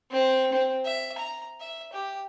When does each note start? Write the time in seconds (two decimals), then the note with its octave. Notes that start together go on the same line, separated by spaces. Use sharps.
0.11 C4
0.52 C4
0.85 E5
1.18 A#5
1.61 E5
1.93 G4